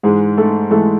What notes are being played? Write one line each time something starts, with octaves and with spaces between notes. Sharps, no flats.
G#2 E3 G#3 G#4
A3 A4
G#2 E3 G#3 A3 A4